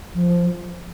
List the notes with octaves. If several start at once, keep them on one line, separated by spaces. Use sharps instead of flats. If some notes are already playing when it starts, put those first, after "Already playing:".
F3